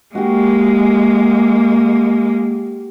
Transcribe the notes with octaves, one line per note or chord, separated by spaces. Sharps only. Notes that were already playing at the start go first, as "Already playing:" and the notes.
G#3 A#3 F#4 G4